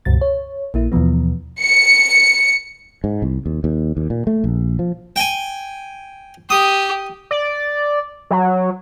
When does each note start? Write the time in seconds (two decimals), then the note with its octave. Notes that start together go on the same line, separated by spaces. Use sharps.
0.05 C#2 G2 B2 A6
0.21 C#5
0.74 A#1 A#3 E4
0.92 D#2 B2 E3 F3 B3
1.62 C#7
3.04 G#2
3.22 C2
3.46 D#2
3.64 D#2
3.97 D#2
4.10 A#2
4.27 A3
4.44 A#1
4.79 F3
5.16 G5 G#5
6.50 G4 D#6
7.31 D5
8.31 F#3